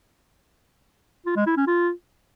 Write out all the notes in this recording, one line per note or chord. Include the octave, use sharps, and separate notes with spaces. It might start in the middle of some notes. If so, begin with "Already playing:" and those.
F4
G#3
E4
C#4
F4